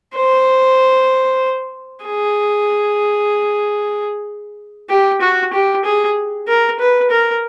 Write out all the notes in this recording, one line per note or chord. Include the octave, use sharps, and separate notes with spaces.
C5
G#4
G4
F#4
G4
G#4
A#4
B4
A#4